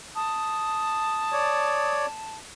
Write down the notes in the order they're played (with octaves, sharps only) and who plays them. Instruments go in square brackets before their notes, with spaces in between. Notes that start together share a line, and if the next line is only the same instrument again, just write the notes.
[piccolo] A5 [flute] D#6
[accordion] C#5 D5